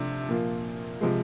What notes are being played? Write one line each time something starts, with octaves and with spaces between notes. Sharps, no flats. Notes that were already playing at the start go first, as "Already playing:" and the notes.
Already playing: C3 F3 A3 D4
A#2 F3 A#3
C3 F3 G#3